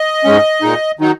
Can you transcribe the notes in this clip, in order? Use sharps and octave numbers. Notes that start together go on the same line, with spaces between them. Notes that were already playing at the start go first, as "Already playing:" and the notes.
Already playing: D#5
G#2 G#3 C#4
A#2 G#3 D#4
D#3 F#3 D#4